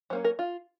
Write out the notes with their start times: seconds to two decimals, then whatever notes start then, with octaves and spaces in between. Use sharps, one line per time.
0.10 F#3 A#3 C#4 C5
0.24 A#4
0.39 F4